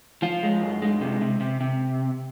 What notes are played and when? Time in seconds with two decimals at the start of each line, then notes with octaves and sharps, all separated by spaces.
0.22 F3 F4
0.43 G#3
0.62 F#2
0.82 G#3
1.01 C3
1.21 C3
1.41 C3
1.61 C3